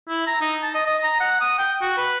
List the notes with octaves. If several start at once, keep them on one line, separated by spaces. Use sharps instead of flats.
E4
A#5
D#4
A5
D#5
D#5
A#5
F#5
D#6
G5
F#4
B4